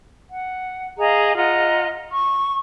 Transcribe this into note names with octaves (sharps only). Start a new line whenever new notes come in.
F#5
G#4 D#5 F5 A#5
F4 D#5 F#5 A#5
C#6